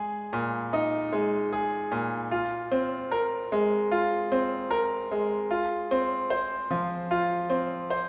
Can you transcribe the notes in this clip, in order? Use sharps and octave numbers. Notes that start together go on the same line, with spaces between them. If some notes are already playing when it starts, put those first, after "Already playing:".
Already playing: G#3 G#4
A#2
D#4
G#3
G#4
A#2
F4
C4
A#4
G#3
F4
C4
A#4
G#3
F4
C4
C5
F3
F4
C4
C5